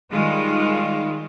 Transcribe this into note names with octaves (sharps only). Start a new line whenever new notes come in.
D#3 G3 G#3 F4